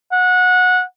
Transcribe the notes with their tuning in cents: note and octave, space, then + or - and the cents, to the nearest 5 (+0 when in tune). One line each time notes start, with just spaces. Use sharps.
F#5 -20